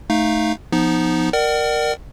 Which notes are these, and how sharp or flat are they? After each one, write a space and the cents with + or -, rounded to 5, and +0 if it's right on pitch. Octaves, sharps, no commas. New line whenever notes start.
A3 -5 D#4 +0 F5 +0
F3 +0 B3 +0 D#4 +0
A#4 +0 D5 +30 F#5 +40